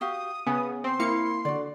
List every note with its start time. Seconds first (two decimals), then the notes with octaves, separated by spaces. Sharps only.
0.01 F#4 G4 F5 D#6
0.46 C#3 B3 G#5
0.84 C4 C6
0.99 A#3 E4 F5 C#7
1.45 D3 F#4 D5